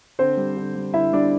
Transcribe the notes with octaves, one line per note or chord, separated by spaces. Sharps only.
D3 C4 C5
G3
D3
G3
D3 E4 E5
G3 D4 D5